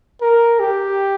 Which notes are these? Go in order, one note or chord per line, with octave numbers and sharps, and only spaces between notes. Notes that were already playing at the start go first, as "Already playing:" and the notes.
A#4
G4